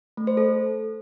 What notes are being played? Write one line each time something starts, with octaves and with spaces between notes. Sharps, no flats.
A3
C5
A4